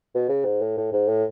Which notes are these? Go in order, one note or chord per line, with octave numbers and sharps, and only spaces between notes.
B2
C#3
G#2
A2
A2
G#2
A2